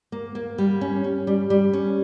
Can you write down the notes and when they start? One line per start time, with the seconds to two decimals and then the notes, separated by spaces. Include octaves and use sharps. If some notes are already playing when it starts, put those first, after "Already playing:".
0.12 A#3
0.35 A#3
0.58 G3
0.81 C#4
1.04 C#4
1.27 G3
1.50 G3
1.73 C#4